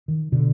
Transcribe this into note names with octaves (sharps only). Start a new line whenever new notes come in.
D#3
B2 D3